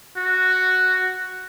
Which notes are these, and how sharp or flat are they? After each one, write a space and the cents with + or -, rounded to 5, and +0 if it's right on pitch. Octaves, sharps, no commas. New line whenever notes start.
F#4 +0